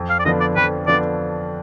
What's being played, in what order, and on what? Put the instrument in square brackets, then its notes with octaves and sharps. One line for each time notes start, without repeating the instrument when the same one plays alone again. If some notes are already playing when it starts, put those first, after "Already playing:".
Already playing: [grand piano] F2
[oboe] F5
D5
[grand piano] D3 F3 B3 D4 [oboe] D#5
[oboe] D5
[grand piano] F2 [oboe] B4
[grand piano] D3 F3 B3 D4 [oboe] D5